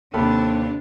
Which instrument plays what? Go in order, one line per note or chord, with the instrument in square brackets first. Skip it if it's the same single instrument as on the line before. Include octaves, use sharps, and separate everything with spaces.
[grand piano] D#2 A4 B5 [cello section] C3 D4